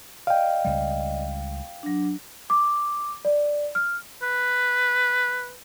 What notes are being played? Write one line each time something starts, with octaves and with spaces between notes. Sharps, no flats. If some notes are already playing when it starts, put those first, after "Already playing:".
D5 D#5 F5 G5
C#2 G3
F#3 D4
D6
D5
F6
B4